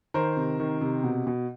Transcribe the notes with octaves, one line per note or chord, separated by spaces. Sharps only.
D#3 A#4 C5
C3
D#3
C3
B2
B2